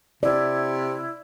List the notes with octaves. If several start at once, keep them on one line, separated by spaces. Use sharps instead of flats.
C3 E4 D5